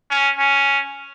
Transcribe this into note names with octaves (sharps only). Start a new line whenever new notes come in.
C#4
C#4